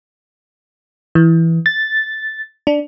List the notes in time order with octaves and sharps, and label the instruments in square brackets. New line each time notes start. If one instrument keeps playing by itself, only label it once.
[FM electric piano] E3
A6
D4